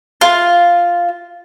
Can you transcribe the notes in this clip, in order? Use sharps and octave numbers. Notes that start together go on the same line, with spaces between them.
F4